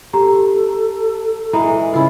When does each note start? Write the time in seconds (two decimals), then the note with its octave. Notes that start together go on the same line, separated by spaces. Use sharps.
0.13 G4 A4 A#5
1.53 E3 G#3 A#5
1.94 C#3 E4 F4